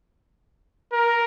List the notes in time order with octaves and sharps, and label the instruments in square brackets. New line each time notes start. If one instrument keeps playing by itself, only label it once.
[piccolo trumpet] A#4